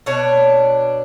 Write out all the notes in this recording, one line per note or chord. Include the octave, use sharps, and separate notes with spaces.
B2 D4 C#5